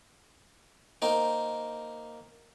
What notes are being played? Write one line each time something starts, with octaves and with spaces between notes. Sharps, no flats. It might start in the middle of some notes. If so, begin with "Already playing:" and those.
A#3 D#4 C5 G5